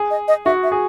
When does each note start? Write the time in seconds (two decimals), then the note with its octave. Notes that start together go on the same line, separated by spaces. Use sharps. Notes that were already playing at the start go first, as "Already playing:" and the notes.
Already playing: G#4
0.11 D#5
0.28 D#5
0.45 F#4 E5
0.63 E5
0.72 G#4